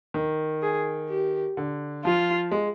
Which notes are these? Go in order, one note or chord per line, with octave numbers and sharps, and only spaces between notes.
D#3
G#4
G4
D3
F3 F4
G#3